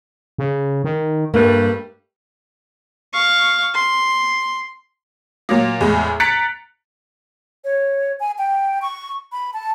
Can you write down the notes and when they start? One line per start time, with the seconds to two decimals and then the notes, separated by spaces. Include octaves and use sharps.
0.38 C#3
0.84 D#3
1.34 G2 G3 A3 A#3 B4
3.13 F5 C#6
3.74 C6
5.49 A#2 F#3 A#3
5.80 E2 A2 G#3
6.20 A#5 F#6 A6 B6 C#7 D7
7.64 C#5
8.20 G#5
8.38 G5
8.82 C#6
9.32 B5
9.54 A5